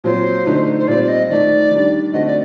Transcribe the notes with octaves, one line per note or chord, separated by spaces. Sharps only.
A#2 F#3 C4 C5
D3 A3 D#4
C5
A#2 G3 C4 D5
D5
D#5
D#3 A3 D#4 D5
D#3 G3 D4
D3 A3 C4 F#4 D#5
D5